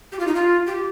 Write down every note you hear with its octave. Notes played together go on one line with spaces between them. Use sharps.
G4
F4
D#4
F4
G4